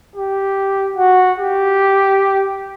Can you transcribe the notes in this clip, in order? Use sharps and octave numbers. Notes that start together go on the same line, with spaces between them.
G4
F#4
G4